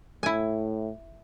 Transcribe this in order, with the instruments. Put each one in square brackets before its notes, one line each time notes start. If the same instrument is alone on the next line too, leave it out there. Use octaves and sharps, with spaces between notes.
[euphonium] A2 [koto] E4 G#5